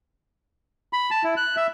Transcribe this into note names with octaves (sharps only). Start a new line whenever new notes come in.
B5
A5
E4
F#6
E5